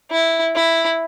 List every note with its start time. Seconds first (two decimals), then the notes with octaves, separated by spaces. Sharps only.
0.10 E4
0.56 E4